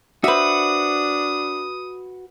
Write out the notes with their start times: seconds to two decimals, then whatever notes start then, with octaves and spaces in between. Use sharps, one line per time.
0.24 D4 F#4 B4 C5 E5 D#6